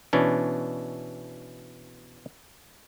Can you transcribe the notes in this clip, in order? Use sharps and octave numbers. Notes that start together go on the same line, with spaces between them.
B2 E3 C#4 D4